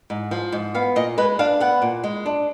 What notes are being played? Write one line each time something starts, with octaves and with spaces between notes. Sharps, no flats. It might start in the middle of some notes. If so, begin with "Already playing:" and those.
G#2
F3
G#2
B3 F5
A#2 D#5
G#3 B4
D4 F5
B3 F#5
A#2
G#3
D4